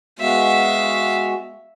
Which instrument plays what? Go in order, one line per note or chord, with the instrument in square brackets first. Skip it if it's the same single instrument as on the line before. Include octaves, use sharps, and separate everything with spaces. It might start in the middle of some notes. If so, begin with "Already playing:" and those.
[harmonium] G#3 B3 F#4 [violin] E5 F5